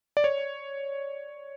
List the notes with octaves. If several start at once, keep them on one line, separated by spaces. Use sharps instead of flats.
D5
C#5